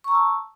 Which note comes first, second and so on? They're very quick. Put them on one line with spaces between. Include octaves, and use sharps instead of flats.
C#6 A#5 E6 A5